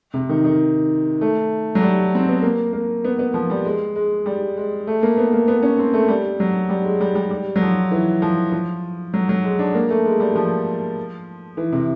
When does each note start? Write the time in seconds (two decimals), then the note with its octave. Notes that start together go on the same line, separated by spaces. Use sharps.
0.14 C3
0.29 D#3
0.44 D#3
1.21 A3
1.75 F#3
1.81 G3
2.15 C4
2.29 B3
2.42 A#3
2.73 A#3
3.05 B3
3.19 B3
3.34 F3
3.50 G3
3.65 G#3
3.95 G#3
4.26 G3
4.57 G#3
4.87 A3
5.03 A#3
5.18 B3
5.33 A#3
5.48 B3
5.63 C#4
5.79 C4
5.93 A3
6.08 G3
6.40 F#3
6.69 G3
6.85 G#3
7.01 G3
7.15 G3
7.31 G3
7.56 F#3
7.61 F3
7.91 E3
8.22 F3
8.52 F3
9.14 F#3
9.29 F#3
9.44 G#3
9.59 D4
9.75 A#3
9.90 A3
10.06 G#3
10.20 G3
10.35 F3
11.57 E3
11.72 C3